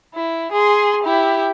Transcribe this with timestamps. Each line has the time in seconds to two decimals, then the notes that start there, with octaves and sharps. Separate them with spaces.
0.14 E4
0.52 G#4 C6
1.04 E4 G4